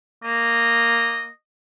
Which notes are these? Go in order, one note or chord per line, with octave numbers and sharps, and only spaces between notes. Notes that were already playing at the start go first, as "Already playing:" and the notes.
A#3 D#5